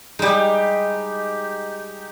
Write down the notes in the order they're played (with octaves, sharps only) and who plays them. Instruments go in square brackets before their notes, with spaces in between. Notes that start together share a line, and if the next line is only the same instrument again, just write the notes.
[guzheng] G3 G#3 [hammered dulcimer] D#4 G4